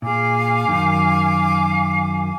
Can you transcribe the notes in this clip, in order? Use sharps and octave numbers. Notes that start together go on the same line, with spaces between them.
A#2 G#4 F5 G#5 D6
F#2 D#3